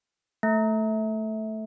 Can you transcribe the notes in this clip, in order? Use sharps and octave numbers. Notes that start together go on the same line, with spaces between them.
A3